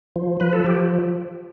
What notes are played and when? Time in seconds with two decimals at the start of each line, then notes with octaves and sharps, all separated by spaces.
0.16 F3
0.40 F3 B4
0.53 A4
0.64 F3 G4